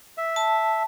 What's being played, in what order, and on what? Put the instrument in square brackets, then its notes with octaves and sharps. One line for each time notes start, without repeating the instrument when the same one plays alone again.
[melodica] E5
[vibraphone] A5